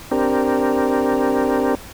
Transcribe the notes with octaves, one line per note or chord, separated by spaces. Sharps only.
C4 D4 G4 A#4